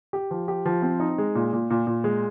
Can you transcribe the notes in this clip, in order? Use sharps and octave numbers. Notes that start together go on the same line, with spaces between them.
G4
F3
G4
F3
C4
D#4
G#3
A#2
A#2
A#2
A#2
G#3